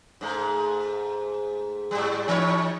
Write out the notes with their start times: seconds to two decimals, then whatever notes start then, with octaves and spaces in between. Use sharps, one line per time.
0.21 G#2 A3
1.91 G#2 G3
2.28 E3 D#4 C#5